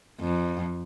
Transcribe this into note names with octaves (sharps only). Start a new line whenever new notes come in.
F2